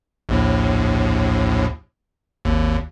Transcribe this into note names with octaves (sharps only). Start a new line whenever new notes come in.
A#1 D#2 A2
G#1 D#2